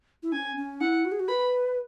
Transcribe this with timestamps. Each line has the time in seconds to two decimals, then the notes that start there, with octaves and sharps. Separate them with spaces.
0.23 E4
0.33 C#4 G#5
0.57 C#4
0.81 E4 F#5
1.05 F#4
1.12 G#4
1.20 F#4
1.28 B4 B5